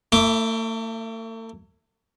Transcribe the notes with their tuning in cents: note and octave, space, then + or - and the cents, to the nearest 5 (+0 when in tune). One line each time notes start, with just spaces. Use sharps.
A3 +40 E4 +0 D6 +0